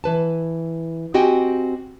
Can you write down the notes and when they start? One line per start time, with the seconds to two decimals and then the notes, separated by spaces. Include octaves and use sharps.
0.04 E3 B4 A5
1.14 C4 F#4 G4 D#5 G5 G#5